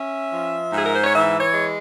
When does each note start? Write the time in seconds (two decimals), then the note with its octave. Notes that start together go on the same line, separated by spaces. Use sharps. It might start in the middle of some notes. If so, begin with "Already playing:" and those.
Already playing: C#4 E5
0.34 F3
0.73 G#2 G#4
0.86 A#4
0.96 C5
1.04 C#5
1.13 E3 E5
1.40 C#5
1.53 G#3